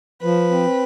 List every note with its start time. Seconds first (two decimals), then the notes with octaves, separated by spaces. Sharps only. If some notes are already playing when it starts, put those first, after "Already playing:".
0.23 F3 B4
0.51 C4